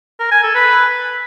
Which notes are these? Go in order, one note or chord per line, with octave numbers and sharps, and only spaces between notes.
A#4
G#5
A4
B4